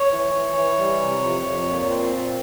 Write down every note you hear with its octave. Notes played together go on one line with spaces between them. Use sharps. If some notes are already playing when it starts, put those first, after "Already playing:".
Already playing: C#5
E3
E3
E3
G3
C3
F2
F2
A#2
C4
A#2